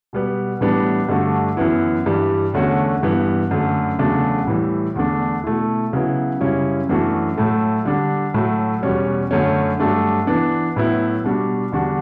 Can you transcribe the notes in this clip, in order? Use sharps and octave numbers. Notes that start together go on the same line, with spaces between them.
B2 G3 B3
A2 E3 G3 B3 D4
G2 D3 A3 D4 F#4
F#2 E3 B3 E4
G2 E3 G3
E2 D3 A3 C#4 F#4
G2 E3 B3
F#2 D3 A3
E2 C#3 F#3 A3 D4
A2 E3 G3
E2 D3 A3 D4
B2 A3 E4
C#3 F#3 B3 E4
F#2 C#3 G3 C#4 E4
F#2 E3 A3 D4 F#4
A2 F#3 A3
D3 G3 D4
A2 F#3 A3
E2 B2 G3 C#4
F#2 D3 A3 C#4
G2 F#3 A3 D4
E3 B3 D4
A2 F#3 B3 E4
B2 G3 D4 F#4
E2 D3 G3 D4 F#4